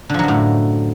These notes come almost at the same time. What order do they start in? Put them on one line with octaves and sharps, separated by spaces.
D3 F3 F#3 F#2 A2